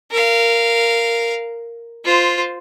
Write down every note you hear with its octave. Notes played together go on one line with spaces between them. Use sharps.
A#4 F5
F4 C5